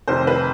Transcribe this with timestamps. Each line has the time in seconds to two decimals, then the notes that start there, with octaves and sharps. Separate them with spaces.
0.07 F1 F2 C3 D#3 C5
0.27 B4